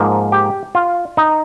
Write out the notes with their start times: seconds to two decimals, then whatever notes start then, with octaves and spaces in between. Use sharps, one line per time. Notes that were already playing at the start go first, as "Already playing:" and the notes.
Already playing: G#2 F3 A#3
0.32 G4
0.75 F4
1.17 D#4